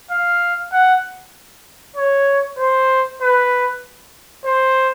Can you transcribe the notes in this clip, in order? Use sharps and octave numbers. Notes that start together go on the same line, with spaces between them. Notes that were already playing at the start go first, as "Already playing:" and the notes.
F5
F#5
C#5
C5
B4
C5